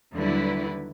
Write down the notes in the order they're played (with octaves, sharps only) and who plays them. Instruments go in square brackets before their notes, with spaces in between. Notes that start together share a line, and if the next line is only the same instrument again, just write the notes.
[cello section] D#2 D3 F#3 G3 E4 B4